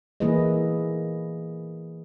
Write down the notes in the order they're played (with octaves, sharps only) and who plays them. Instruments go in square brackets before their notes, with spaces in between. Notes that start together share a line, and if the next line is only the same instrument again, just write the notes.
[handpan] E3 A#3 E4 G#4 B4 D#5